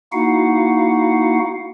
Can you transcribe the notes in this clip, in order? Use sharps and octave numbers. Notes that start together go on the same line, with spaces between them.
A#3 D#4 E4 F#4 F5 F#5